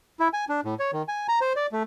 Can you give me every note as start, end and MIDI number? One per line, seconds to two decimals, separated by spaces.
0.20 0.28 64
0.33 0.45 80
0.49 0.61 62
0.64 0.74 45
0.79 0.91 73
0.93 1.02 51
1.08 1.27 80
1.28 1.39 82
1.41 1.53 72
1.56 1.67 74
1.72 1.83 57